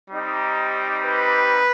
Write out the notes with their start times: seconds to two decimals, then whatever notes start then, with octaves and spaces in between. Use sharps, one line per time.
0.10 G3 C4 D#4 G4
1.05 B4